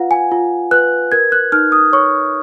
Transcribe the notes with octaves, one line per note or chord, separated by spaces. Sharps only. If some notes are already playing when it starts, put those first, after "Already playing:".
Already playing: F4 B4 F5 F#5
G#5
F4
B4 F#6
A#4 G#6
F#6
D#4 F6
D#6
C#5 C#6